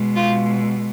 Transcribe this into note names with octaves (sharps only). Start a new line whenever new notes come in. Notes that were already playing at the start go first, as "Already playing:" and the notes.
Already playing: B2 G#3
F4